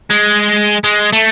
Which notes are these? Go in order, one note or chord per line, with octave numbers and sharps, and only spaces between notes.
G#3
G#3
A3